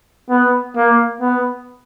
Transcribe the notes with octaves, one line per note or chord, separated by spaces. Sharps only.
B3
A#3
B3